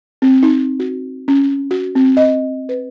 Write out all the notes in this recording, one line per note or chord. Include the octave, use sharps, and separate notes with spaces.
C4
D#4
F#4
C#4
F#4
C4
D#5
B4